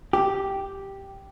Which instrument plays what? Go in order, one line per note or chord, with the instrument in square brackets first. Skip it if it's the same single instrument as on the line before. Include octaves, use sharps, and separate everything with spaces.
[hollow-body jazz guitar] G4